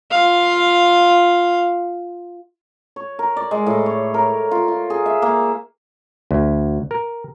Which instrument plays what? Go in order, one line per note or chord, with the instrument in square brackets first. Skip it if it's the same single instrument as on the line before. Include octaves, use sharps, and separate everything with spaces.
[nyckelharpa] F4 F5
[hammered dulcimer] C#5
A#4
D5
G#3
A2
C#5
A#4
F4
F4
G#4
E5
A#3
[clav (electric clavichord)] D2
A#4